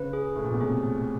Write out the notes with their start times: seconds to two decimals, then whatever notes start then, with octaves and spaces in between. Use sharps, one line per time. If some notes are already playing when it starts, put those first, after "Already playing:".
Already playing: C#3 B4
0.13 G#4
0.36 A2
0.44 A#2
0.52 B2
0.61 C3 G#4